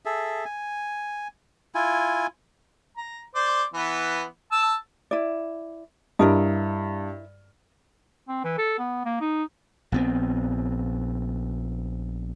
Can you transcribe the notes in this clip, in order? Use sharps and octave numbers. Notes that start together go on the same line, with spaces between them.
G#4 A4 E5
G#5
E4 F4 G#5
A#5
C5 D5
E3 B3
A5 E6
E4 D5
G2 E4 A#4 D#5
C4
E3
A4
B3
A#3
D#4
A#1 B3 C4